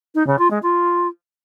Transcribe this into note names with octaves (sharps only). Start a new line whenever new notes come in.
D#4
C#3
F4
G#3
F4